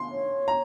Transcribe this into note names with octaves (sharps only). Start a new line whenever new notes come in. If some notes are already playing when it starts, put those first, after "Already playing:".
Already playing: C6
C#5
A#5